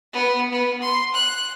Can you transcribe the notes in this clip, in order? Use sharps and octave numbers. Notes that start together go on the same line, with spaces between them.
B3
B3
C6
F#6